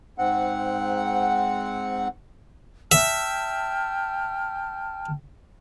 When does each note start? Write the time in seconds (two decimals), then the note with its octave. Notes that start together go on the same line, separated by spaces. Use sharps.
0.18 G#2 C4 F#5
2.92 E5 G5 A5 F6